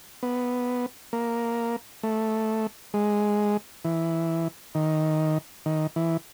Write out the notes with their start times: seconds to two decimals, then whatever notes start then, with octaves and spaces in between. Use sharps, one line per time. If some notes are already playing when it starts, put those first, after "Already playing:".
0.23 B3
1.13 A#3
2.03 A3
2.94 G#3
3.85 E3
4.75 D#3
5.66 D#3
5.96 E3